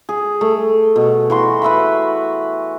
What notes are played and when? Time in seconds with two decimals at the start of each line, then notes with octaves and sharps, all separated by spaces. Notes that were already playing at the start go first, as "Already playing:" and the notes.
0.09 G#4
0.41 A3
0.96 B2
1.30 E3 F#4 C6
1.62 B4 E5 F#5 B5